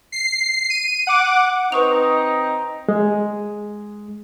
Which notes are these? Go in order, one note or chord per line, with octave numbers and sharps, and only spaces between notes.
C7
D#7
F#5 D6
C4 D#4 B4 C#6 F7
G#3